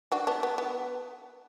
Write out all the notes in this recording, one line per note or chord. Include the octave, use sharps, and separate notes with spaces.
D4 F#4
B3 D4
B3
B3